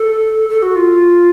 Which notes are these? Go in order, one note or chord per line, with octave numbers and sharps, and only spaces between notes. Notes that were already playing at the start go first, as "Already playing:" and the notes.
Already playing: A4
A4
F#4
F4